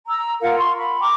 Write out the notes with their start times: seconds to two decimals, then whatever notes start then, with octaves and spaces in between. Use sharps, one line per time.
0.07 A#5 E6
0.40 F4 A#4 F5 F#5
0.58 C6 C#6
0.77 B5
1.00 G5 A#5 D6